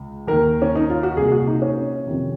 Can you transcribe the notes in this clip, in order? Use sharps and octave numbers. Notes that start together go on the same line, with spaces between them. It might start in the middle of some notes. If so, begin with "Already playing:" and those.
Already playing: C#2
D#2 D#3 A#4
C#4
D#4
F4
F#4
C2 A#2 G#4
F#4
D#4
C#4
F2 C3 D#3